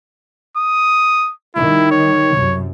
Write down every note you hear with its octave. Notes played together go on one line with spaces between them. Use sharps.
D#6
D#3 G3 E4
C#5
C2 F#2